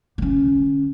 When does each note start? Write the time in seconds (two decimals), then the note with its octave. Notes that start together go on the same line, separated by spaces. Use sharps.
0.18 D3 C#4